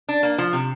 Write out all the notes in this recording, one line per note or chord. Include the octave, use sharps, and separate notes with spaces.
D4
A#3
F3
C3